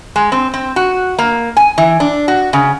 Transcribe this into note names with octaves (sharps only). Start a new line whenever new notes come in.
G#3
C4
C4
F#4
A#3
G#5
E3
D4
F#4
C#3